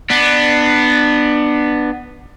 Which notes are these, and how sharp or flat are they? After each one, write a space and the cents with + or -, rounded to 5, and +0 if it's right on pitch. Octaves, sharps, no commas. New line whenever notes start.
B3 +0 D4 +20